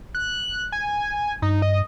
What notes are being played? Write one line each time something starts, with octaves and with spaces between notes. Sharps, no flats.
F#6
G#5
G2 D#4
D#5